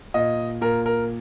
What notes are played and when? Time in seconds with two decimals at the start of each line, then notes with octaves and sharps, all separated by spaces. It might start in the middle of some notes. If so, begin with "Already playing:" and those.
0.14 A#2 D#5
0.61 A#2 A#4
0.86 A#4